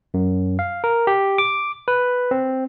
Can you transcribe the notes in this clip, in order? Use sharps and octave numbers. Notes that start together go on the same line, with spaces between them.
F#2
F5
A#4
G4
D6
B4
C4